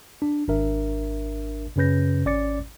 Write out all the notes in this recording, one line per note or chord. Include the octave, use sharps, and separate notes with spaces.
D4
G#1 D4 A#4 E5
F#2 C#3 C#4 B4 G6 A#6
G#1 C#4 D5 D6 A6 C#7